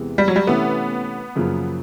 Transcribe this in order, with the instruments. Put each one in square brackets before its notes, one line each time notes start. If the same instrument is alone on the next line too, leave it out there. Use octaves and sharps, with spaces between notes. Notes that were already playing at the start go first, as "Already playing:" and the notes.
Already playing: [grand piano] E2 C3 E3 G#3 B3
[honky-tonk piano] G3
F#3
G3
[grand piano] C3 E3 A3 C#4 [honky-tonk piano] B3
[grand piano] F#2 C#3 F3 A#3